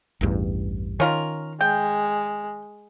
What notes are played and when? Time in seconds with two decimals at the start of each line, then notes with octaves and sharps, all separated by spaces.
0.21 A1 E2 G2
1.00 D#3 C#4 F4 A#4
1.61 G#3 G5